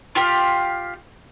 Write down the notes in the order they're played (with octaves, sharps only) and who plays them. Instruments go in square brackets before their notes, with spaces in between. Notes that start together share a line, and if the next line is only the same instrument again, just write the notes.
[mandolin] F4 G4 F5